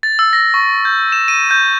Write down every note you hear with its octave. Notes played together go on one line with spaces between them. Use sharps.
A6
E6
A#6
C#6
G6
E7
D#7
G6